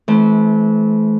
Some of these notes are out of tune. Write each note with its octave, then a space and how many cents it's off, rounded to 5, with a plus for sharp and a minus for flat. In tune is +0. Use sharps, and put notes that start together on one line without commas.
E3 -20 A3 -40 C4 +0